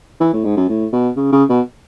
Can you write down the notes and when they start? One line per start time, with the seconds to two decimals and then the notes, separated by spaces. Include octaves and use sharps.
0.20 E3
0.33 A2
0.44 G#2
0.57 F#2
0.69 A2
0.93 B2
1.17 C#3
1.32 C#3
1.49 B2